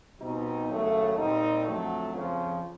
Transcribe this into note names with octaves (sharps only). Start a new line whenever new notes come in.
B2 G3 C4 D#4
D#2 C#3 F#3 A3
A#2 G3 C4 D#4
F2 D3 F#3 A3
F2 C#3 F3